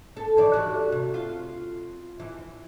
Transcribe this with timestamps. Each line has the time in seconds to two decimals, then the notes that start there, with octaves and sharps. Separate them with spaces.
0.17 A4
0.37 D#3 E3 D5
0.53 G3 F#4
0.92 C3
1.14 F4
2.20 E3